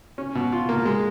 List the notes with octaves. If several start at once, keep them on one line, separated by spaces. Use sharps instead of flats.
C#4
B2
F4
A#3
G#3